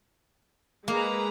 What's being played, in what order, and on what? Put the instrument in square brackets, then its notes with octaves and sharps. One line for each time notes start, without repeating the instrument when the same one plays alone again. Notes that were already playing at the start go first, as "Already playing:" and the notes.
[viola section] G#3 B4 A#5 [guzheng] A#3